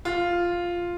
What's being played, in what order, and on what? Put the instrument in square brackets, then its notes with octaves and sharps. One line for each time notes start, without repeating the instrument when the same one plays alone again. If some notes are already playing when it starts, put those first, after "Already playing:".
[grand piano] F4